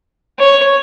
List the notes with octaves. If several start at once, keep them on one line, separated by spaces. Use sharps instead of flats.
C#5